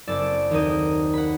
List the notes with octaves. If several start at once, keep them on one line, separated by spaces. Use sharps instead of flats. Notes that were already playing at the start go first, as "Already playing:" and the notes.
F#1 C4 D5 E6 A6
D#2 C4 D#4 A#4 D#6
F#5 B5